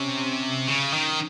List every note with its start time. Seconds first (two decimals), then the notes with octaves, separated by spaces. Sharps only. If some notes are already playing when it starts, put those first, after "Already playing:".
Already playing: C3 C#4
0.68 C#3
0.93 D#3